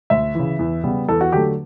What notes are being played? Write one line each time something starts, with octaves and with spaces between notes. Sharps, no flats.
D2 E5
C#3 E3
E2
C#3 G3 B3
E2 A4
F#4
D3 F#3 A3 G4